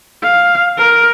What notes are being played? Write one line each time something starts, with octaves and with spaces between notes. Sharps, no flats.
F5
A#4